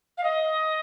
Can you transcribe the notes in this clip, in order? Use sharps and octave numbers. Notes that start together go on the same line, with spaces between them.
F5
D#5